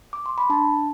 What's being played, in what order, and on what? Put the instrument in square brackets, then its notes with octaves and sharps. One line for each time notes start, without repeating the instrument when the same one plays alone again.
[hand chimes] D6
C6
B5
D4 A5